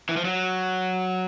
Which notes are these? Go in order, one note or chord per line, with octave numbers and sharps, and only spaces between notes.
E3
F3
F#3